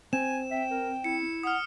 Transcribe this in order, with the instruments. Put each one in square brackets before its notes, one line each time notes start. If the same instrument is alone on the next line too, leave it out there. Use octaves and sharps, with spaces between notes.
[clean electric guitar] C4 [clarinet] G#5 [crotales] E7
[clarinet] E5 [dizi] G5
[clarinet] A#4
[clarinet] E4 [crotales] C#7
[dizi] F#5 [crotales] D#6 F6